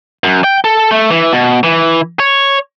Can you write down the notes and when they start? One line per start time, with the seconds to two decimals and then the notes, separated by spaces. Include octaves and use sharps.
0.24 F#2
0.44 G5
0.64 A4
0.91 A3
1.10 E3
1.32 B2
1.64 E3
2.20 C#5